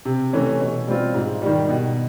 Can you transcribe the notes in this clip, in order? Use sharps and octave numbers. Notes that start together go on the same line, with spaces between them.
C3
E3 A3 C#4
B2
G3 C4 F4
G#2
D#3 G3
B2